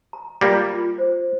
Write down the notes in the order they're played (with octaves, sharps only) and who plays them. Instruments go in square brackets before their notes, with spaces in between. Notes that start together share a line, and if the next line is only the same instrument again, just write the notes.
[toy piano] A#5
[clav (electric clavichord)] G3 A#3 [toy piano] F4
[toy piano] F4
C5